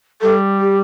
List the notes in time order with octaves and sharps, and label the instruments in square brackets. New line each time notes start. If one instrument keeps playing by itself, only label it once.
[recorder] G3 [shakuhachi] A4
[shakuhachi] G4